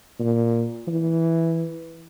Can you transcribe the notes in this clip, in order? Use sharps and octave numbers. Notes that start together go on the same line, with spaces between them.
A#2
E3